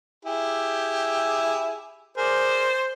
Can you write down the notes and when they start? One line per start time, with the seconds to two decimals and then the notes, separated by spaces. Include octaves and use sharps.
0.25 E4 G4 G#4
2.17 G#4 A#4 C5 D5